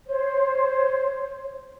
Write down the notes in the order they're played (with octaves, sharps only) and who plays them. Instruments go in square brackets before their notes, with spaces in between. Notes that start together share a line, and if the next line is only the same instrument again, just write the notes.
[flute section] C5 C#5